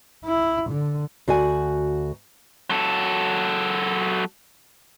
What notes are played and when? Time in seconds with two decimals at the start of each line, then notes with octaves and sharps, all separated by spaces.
0.25 E4
0.70 D3
1.28 D2 F#4 D5 G#5
2.70 F#3 A4